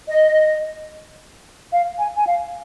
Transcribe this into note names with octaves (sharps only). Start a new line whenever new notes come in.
D#5
F5
G#5
G#5
F5